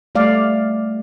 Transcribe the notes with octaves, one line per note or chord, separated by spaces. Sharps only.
G3 A3 D5 F5